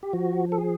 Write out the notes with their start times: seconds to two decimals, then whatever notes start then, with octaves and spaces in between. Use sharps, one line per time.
0.03 G4
0.13 F3 F#4
0.52 A4
0.58 G#4